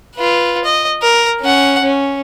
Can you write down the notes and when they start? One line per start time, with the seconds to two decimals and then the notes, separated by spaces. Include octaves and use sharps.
0.15 F4 B4
0.64 D#5
1.02 A#4
1.41 C#4 F#5
1.82 C#4